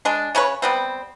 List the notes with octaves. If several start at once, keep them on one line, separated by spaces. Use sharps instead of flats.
G#3 D4
C#3 C#4 B4 C#5
G3 B3 C4